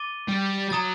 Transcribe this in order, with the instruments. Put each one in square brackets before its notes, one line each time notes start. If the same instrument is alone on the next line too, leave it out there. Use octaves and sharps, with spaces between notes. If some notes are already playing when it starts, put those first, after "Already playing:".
Already playing: [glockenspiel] D6 A6 D#7 G7
[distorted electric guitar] G3
[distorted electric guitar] F#3 [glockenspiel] A#5 D#6 A6